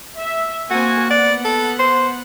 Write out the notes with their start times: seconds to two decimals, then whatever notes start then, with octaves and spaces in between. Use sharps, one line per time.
0.18 E5
0.71 A#3 C4 F#4 G#5
1.10 B3 D5 F#5
1.45 A4
1.79 C5